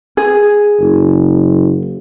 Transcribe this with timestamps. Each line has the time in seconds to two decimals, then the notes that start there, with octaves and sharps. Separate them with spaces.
0.17 G#4
0.80 F#1